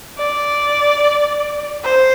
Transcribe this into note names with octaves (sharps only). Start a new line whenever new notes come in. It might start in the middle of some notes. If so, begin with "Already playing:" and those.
D5
C5